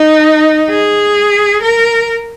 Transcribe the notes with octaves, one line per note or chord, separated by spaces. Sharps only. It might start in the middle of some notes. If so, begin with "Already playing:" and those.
Already playing: D#4
G#4
A#4